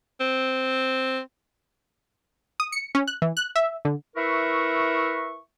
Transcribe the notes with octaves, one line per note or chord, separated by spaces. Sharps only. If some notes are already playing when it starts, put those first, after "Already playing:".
C4
D#6
C#7
C#4
F#6
E3
F#6
E5
D3
E4 A#4 B4 E5 C#6